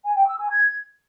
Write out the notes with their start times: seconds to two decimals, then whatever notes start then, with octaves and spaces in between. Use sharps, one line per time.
0.04 G#5
0.16 G5
0.27 E6
0.39 G#5
0.51 G#6